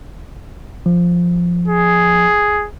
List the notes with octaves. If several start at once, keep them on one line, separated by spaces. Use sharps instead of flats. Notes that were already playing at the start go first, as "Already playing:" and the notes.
F3
G#4